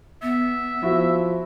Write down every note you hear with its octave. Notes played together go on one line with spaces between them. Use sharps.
B3 E5
F3 E4 F#4